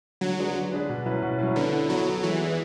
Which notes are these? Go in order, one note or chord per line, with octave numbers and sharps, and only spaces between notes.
D3 F#3
G#3 D4 G#4 B4
D3
G#3 D4 G#4 B4
B2
F#3 C#4 E4 B4
B2
F#3 C#4 E4 B4
D3 B3
E4 A4
F#3 B3
E4 A4
E3 G#3
B3 E4 G#4 D5